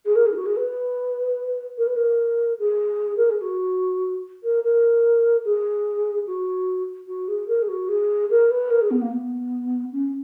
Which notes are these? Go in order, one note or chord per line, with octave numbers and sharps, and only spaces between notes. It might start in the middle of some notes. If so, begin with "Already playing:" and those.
G#4
A#4
G#4
E4
F#4
G#4
B4
A#4
B4
A#4
G#4
A#4
G#4
F#4
A#4
A#4
G#4
F#4
F#4
G#4
A#4
G#4
F#4
G#4
A#4
B4
A#4
G#4
B3
A#3
B3
C#4